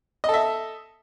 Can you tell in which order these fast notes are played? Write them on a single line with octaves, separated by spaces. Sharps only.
D#5 A4 E5